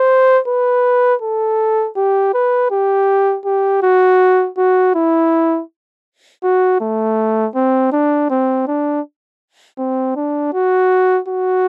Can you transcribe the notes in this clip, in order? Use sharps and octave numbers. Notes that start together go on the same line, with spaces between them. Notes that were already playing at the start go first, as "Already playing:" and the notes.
Already playing: C5
B4
A4
G4
B4
G4
G4
F#4
F#4
E4
F#4
A3
C4
D4
C4
D4
C4
D4
F#4
F#4